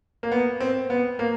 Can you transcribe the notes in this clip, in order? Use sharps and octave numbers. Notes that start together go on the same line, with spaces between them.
A#3
B3
C4
B3
A#3